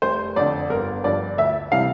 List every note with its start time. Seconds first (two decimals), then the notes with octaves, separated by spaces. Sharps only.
0.02 F1 C5
0.36 F2 D3 D5
0.70 G1 A#4
1.04 G2 F3 D5
1.38 D2 E5
1.72 C3 E3 G3 F5